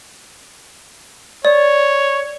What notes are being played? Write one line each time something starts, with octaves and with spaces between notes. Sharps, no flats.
C#5 D5